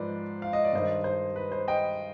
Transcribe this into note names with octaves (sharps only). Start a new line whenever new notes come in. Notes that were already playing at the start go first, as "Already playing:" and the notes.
Already playing: G#2 F3 B4 C5 D5
F5
D#5
D5
G2 D#3 C5 D#5
C5
B4
C5
D#5 G5